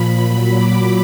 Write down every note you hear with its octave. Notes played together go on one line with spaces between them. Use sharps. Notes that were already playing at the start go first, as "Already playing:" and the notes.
Already playing: A#2 F3 B5
A#2 F#3
D6